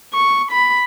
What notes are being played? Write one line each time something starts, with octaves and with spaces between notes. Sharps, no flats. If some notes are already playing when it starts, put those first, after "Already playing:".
C#6
B5